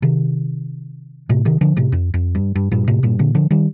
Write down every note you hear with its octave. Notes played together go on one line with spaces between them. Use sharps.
C3 D#3
A2 C3
C3 D#3
D3 F3
A2 C3
F2
F2
G2
G2
G2 A#2
A2 C3
G2 A#2
A#2 D3
D3 F3
D#3 G3